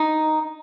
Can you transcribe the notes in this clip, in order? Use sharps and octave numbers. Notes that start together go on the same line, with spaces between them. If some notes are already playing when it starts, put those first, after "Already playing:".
Already playing: D#4